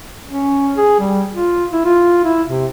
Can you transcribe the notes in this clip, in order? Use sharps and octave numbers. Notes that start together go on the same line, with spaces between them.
C#4
G#4
G3
F4
E4
F4
E4
C3